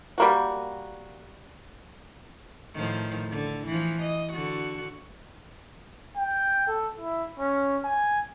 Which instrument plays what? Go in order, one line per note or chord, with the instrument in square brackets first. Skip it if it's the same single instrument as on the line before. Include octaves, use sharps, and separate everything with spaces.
[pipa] G3 A#3 F#4
[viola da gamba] A2 D#3 F3
D3
E3 F3
D#5
D3 F#4
[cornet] G5
A4
E4
C#4
G#5